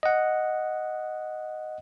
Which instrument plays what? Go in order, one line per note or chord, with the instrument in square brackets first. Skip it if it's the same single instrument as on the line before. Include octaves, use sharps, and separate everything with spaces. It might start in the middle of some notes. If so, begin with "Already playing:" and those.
[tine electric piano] D#5 F#5